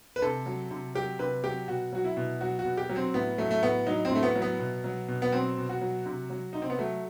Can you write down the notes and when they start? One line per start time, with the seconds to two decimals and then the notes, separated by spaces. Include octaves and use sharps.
0.16 B4
0.22 C3 A4
0.46 F#3
0.71 C3
0.95 F#3 G4
1.19 C3 B4
1.44 F#3 G4
1.68 B2 F#4
1.92 F#3 F#4
2.04 E4
2.17 B2
2.41 F#3 F#4
2.59 F#4
2.65 B2
2.77 G4
2.90 F#3
2.96 C4
3.14 A2 B3
3.38 F#3 A3
3.51 A3
3.62 A2 B3
3.86 F#3 D#4
4.05 C4
4.11 A2 A3
4.23 B3
4.36 F#3
4.42 B3
4.60 B2
4.84 F#3
5.08 B2
5.22 B3
5.32 F#3 C4
5.57 B2
5.69 F#4
5.81 F#3
6.06 C3
6.30 F#3
6.53 C3 D#4
6.62 C4
6.70 B3
6.79 F#3 A3